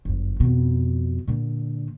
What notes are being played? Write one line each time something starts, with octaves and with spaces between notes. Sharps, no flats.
G1 F#2
F2 B2
A#2 D3